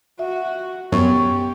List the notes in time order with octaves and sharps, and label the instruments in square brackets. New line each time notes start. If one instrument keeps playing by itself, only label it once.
[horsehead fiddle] F#4 [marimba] E5
[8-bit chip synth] F#2 [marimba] B3 [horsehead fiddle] G4 [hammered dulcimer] C#5